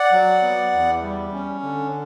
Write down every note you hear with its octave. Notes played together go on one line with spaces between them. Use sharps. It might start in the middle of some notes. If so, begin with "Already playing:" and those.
Already playing: D5 F#5
F#3
B3
E2
G3
C#4
D3